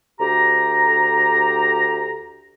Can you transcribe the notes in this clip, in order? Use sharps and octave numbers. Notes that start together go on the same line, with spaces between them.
D2 G4 A#5